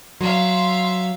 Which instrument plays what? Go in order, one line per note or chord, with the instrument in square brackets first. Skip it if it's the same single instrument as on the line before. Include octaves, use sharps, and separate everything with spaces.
[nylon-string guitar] F#3 [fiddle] E5 F5 [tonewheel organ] C6